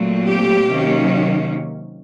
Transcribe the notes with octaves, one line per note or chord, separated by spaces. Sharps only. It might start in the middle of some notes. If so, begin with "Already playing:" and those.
Already playing: A#2 F#3 A3 C4
G4
C3 D#3 F#3 A#3 C#4